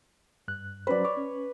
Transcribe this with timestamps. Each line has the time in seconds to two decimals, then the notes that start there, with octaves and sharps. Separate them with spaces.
0.48 G2 F#6
0.87 F#3 C#4 B4 C5 D5
1.05 C#5 D6
1.17 C#4